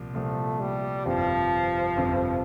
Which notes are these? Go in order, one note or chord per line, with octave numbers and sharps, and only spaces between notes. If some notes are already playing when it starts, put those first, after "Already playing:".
Already playing: C2 A#2 F3
C2 A#2 F3 A3
G3
G1 F2 C3 F3
G1 F2 C3